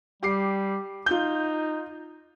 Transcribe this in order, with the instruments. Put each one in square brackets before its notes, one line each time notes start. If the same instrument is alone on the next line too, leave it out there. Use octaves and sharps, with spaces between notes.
[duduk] G3 [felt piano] G4 D6 C7
[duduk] D#4 [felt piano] F4 G6